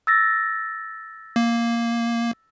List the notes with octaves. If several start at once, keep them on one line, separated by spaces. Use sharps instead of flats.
E6 A6 A#6
A#3